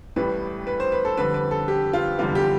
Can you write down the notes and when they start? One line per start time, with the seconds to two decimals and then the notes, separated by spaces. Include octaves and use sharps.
0.16 A1 A2 G3 B4
0.67 B4
0.80 C5
0.92 B4
1.05 A4
1.17 F2 D3 G3 C4 B4
1.34 B4
1.51 A4
1.68 G4
1.93 F4
2.19 F1 E2 D3 G3 F4
2.35 G4